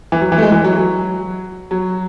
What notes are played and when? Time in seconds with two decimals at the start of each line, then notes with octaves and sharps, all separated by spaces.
0.12 E3
0.21 F#3
0.32 E3
0.38 A3
0.42 G#3
0.52 E3
0.64 F#3
0.78 F#3
1.71 F#3